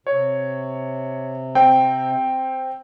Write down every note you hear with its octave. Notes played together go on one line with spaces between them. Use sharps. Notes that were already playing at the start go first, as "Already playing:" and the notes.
C3 C#5
C4 G5